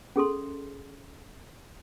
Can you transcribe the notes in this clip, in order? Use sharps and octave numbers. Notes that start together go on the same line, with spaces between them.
C#4 G#4 A4 C6